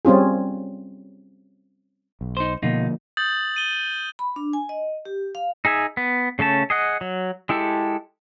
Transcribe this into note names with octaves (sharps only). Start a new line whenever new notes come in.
G3 C4 C#4 F4 G#4
B1
D#4 C5
B2 D3 F3 A#3 D#4 F4
D#6 G6 A6 F#7
D#7 G7
B5
D4
G#5
D#5
G4
F5
D#4 G#4 E5 G#5
B3
C#3 A3 C#4 A5
G#4 D#5 F#5
F#3
G#3 E4 G4 A4